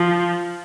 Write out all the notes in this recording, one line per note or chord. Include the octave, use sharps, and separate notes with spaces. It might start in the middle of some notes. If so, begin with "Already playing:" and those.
Already playing: F3